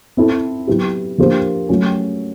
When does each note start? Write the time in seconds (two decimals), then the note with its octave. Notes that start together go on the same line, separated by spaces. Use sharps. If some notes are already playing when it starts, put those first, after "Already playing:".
0.17 C4 E4 A4
0.67 F#3 B3 E4 G4
1.18 F3 A#3 D4 G4 C5
1.69 F#3 A3 C#4